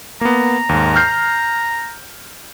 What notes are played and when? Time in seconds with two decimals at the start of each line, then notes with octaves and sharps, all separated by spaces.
0.21 A#3 B3 A#5
0.69 D#2 G#2
0.96 F6 G6 C7